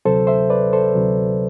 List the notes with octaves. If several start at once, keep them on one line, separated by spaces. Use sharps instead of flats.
D2 C3 F#3 A4 C5
C5 E5
B4 D5
A4 C5
D2 C3 F#3